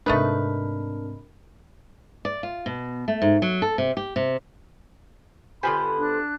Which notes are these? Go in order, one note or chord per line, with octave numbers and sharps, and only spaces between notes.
G#2 C3 A3 D4 D#4 A#4 B4
D5
F4
B2
A3
G#2
F#3
A4
C3
G4
C3
D3 B3 F4 G4 C5 G#5 B5
D4 F#6